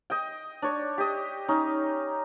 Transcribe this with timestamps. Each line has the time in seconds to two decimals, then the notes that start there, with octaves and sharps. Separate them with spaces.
0.10 D#5 G5
0.62 D4 C#5
0.98 G4 D#5
1.48 C#4 D#4